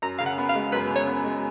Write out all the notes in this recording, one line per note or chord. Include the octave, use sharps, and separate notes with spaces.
F#2 A#5
C#3 F5
F#5
B3
F5
G#3
F#2 B4
C#3
C#5
B3
G#3